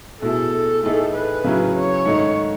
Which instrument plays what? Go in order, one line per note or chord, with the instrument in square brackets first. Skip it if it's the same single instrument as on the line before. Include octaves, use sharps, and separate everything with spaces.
[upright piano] B2 A3 E4 G#4 [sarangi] A4
[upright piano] A2 E3 A3 D#4 G#4
[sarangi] B4
[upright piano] C#3 F#3 C#4 E4 G#4
[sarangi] C#5
[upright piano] G#2 D#3 A3 D#4